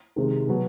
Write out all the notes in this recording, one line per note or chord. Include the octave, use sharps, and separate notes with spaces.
C3 D#3 G#3
B2 F#3 B3